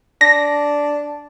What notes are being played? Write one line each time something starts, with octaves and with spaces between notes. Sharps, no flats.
D4 A#6